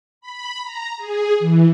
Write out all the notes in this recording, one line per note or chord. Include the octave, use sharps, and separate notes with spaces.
B5
A#5
G#4
E3